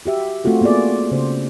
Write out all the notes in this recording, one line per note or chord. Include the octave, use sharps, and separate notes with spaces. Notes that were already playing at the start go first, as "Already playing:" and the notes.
F#4 G4 E5
A3 C4 F4 F#4 A4
A#3 B3 F4 G#4 D5
C#3 C5